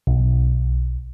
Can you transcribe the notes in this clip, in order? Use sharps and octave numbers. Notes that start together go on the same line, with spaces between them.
B1